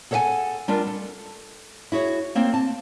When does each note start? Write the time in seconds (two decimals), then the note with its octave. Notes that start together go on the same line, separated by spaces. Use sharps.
0.11 G#4 A4 C#5 F5 F#5 G#5
0.68 G3 D4 F4 A#4 D5
0.87 A4
1.92 E4 F#4 G#4 C#5
2.35 A#3 C4 C5 C#5
2.54 A5